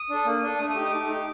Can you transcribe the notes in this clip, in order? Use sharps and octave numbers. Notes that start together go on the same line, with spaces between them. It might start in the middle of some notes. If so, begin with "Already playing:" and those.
Already playing: D#6
D4 A4
A#3
D4 A4
A3 D#6
D#6
D#4 G4
D#6
A3 D6
D#4 G4